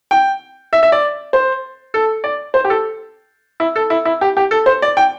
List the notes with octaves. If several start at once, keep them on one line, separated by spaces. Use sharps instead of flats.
G5
E5
E5
D5
C5
A4
D5
C5
G4
A4
E4
A4
E4
E4
G4
G4
A4
C5
D5
G5